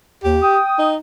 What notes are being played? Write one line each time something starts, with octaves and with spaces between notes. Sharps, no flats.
D#2 G4
G5 D#6
D#4